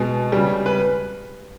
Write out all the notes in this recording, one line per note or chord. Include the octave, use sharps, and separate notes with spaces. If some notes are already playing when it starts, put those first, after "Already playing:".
Already playing: B2 G#3
C#3 G3
B4